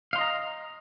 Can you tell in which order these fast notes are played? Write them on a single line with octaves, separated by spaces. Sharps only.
F5 C6 D#5 A#5